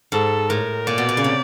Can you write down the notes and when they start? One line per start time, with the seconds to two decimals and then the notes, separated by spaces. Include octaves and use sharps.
0.12 G#2 A4
0.49 A2 A#4
0.87 A#2 D5
0.98 B2
1.09 A#2
1.17 C#3
1.24 C3